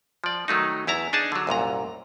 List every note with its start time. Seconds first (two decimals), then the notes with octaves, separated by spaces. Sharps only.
0.24 F3 D5
0.48 D#3 F#3 A3 D#4
0.87 E2 E4 A5 A#5
1.13 D4 D#4 G#4 A5
1.32 D3 F#3
1.47 C2 F#2 A#2 A#5